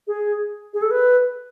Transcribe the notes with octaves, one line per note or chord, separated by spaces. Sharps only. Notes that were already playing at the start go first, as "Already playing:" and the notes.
G#4
G#4
A4
B4